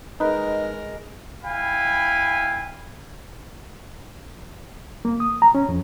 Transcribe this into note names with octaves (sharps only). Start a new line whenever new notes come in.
G#3 D#4 A#4 B4
E4 F5 G5 G#5 B5
A#3
D#6
A#5
C#4
F2